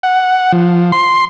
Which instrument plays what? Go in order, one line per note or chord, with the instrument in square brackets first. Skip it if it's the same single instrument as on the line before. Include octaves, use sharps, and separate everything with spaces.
[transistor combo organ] F#5
F3
C6